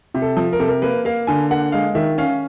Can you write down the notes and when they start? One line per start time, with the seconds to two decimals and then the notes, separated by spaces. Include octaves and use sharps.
0.14 C3
0.22 A4
0.37 F3
0.53 A#4
0.60 C3 A4
0.68 A#4
0.82 A#3 B4
1.05 A#3 F5
1.27 D3 G#5
1.50 A#3 F#5
1.72 G#3 F5
1.95 D#3 E5
2.18 C#4 F5